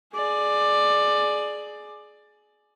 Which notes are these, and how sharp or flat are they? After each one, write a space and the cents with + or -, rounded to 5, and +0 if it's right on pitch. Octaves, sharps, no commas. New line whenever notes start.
G#4 +20 D5 +15